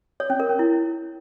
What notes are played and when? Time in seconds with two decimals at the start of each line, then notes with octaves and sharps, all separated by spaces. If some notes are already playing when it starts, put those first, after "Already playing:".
0.20 C#5
0.30 C#4
0.40 A#4
0.49 C#4
0.59 E4